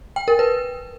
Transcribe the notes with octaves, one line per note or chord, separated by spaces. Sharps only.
G5
A#4
B4